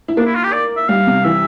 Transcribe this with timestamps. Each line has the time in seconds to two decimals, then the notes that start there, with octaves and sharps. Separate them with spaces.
0.08 E4
0.17 A#3 D4
0.26 E4
0.35 F4
0.44 G4
0.53 D5
0.77 E5
0.89 G3 F5
1.07 C3
1.25 E3 E5